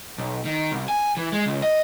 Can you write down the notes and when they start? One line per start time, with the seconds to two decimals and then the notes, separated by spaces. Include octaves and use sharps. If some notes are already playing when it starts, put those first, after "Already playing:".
0.18 B1
0.45 D#3
0.72 C2
0.88 G#5
1.17 E3
1.32 G#3
1.46 C#2
1.62 D#5